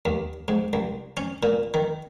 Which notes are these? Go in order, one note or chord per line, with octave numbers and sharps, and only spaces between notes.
D#2
G#2
C2
C#4
A#2
D#3